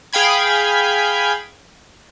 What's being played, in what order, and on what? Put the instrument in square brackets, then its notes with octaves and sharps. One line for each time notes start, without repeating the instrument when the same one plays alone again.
[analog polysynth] G#4 F5 G5 B5 G#6